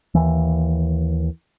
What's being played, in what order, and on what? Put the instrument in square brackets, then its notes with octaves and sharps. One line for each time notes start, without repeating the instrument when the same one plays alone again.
[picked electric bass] D#2 E3